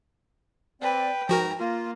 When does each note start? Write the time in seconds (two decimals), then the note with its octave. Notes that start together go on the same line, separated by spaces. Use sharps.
0.82 C4 B4 D5 G5
1.29 G#2 F3 F#4 A#4 A#5
1.59 A#3 F4